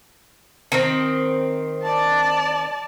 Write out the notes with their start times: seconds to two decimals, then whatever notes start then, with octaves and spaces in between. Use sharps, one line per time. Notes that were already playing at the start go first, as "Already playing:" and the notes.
0.72 D#3 C4
1.83 D5 A5